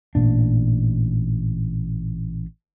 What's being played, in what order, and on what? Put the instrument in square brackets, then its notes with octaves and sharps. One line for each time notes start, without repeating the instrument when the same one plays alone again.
[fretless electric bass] A1 A#2 D4